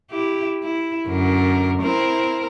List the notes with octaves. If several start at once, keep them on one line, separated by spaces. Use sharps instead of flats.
E4 G4
E4
F#2 D3 A#4
C4 E4 A#4